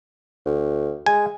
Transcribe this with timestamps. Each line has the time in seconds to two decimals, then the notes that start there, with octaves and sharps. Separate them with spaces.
0.46 D2
1.06 G#3 G#5